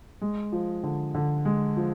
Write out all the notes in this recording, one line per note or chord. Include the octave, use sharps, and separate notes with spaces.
G#3
F3
D3
D3
G#3
F3